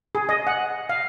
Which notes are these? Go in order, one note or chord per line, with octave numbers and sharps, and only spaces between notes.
G#4
D#5
F#5
F5